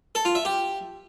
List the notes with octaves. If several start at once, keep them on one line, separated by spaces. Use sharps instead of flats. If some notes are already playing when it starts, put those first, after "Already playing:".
A4
F4
E5
G4